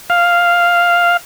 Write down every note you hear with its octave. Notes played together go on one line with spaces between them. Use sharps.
F5